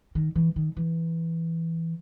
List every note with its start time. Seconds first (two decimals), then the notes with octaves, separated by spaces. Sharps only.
0.15 D#3
0.35 E3
0.56 D#3
0.77 E3